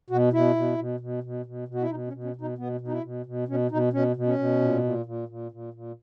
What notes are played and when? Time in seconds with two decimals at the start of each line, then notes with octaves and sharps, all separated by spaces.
0.10 B2 F#4
0.33 B2 E4
0.56 B2
0.78 B2
1.00 B2
1.24 B2
1.46 B2
1.68 B2
1.74 F#4
1.82 E4
1.90 B2 D#4
2.08 C#4
2.13 B2
2.24 C#4
2.36 B2
2.41 D#4
2.58 B2 B3
2.81 B2
2.88 D#4
2.92 E4
3.03 B2
3.26 B2
3.48 B2 C#4
3.71 B2 D#4
3.93 B2 C#4
4.16 B2
4.27 C#4
4.39 B2
4.61 A#2
4.83 A#2
5.06 A#2
5.28 A#2
5.52 A#2
5.74 A#2